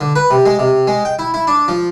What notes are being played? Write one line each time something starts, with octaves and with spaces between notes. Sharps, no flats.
D3
B4
C3
G#3
C3
G#3
G5
E4
E4
D4
F3